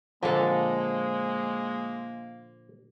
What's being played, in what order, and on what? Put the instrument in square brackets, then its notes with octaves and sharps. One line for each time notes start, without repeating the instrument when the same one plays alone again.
[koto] A#2 D3 A4 [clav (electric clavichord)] F3 [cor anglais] G#3 [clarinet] A#3